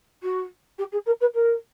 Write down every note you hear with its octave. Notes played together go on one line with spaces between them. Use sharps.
F#4
G4
G#4
A#4
B4
A#4